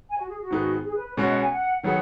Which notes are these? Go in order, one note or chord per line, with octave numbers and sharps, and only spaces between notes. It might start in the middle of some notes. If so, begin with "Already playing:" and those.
G#5
F#4
G#4
F#4
G#2 D#3 B3 D#4 G#4
G#4
B4
B4
B2 G#3 C#4 F#4 C#5
D#5
F#5
G#5
F#5
D#3 F#3 B3 G#4 F#5